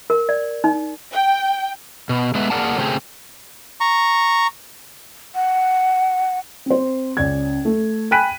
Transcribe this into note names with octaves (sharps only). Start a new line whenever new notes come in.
A#4
D5
D#4
G5
B2
G#3 A3 B3 B4 E5
A#3 G#4 A#4 D5 F#5 A5
C#3 A3 C4 G4 G#4
A#5 C#6
F#5
C4 C5
C#2 C#4 D5 G#6
A3
G5 G#5 B5 F#6 B6 D#7